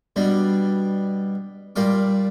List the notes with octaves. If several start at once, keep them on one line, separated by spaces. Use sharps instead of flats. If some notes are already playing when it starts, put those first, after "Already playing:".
B2 G3 D4
A#2 G3 F5 D6